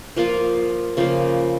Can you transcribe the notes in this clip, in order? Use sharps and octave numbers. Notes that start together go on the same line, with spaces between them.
F3 A#3 F4
C#3 F3 A#3